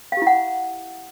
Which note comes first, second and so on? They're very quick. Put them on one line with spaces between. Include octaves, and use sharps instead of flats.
F5 G4 E4 F#5